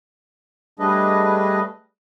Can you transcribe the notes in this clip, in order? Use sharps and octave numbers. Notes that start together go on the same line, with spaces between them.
G3 A3 D4 G#4 B4 D#5